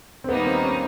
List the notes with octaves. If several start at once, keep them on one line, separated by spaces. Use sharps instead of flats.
C4
D#2 D#3 G3 A#3 B3 D#4
C4
C#4